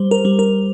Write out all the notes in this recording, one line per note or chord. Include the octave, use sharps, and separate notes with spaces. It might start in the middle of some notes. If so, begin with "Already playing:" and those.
Already playing: G3 C5
A#4
G3
A#4